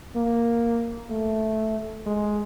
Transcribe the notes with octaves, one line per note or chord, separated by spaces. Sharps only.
A#3
A3
G#3